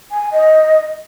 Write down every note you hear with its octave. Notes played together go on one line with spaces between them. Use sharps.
G#5
D#5